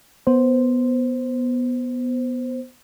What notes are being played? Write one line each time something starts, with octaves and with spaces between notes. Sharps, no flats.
B3 C5